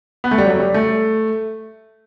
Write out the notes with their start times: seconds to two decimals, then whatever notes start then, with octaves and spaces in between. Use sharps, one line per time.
0.24 B3
0.31 A3
0.38 G3
0.46 F#3
0.60 G3
0.74 A3